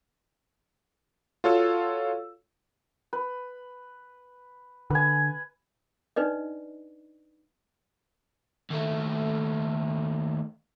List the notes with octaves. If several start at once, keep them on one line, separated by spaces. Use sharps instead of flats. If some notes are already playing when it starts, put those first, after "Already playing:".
F4 F#4 A4 C#5 F5 E6
B4
D3 B4 G#5
D4 D#4 B4 D5 D#5
D#2 A3